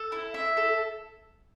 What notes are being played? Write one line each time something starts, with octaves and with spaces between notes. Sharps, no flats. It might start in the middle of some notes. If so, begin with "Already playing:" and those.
Already playing: A4
E4
E5
A4